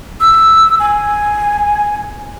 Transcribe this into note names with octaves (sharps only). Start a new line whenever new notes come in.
E6
G#5